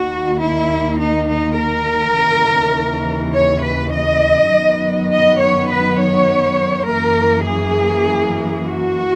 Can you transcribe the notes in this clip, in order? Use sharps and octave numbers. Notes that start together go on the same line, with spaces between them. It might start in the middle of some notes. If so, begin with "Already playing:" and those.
Already playing: D#2 D#3 A#3 F#4
E4
D#4
D#4
A#4
D#2 C#3 E3
C#5
B4
D#5
F#2 D#3 F#3 B3
D#5
C#5
B4
C#5
F#2 E3 A#3 A#4
G#4
F#4